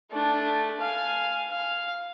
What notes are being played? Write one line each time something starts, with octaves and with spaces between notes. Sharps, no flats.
A3 D4
F5 G#5
F5